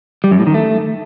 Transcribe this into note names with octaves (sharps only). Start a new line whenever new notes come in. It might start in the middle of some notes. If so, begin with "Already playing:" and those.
G3
F#2
A2
D#3
A3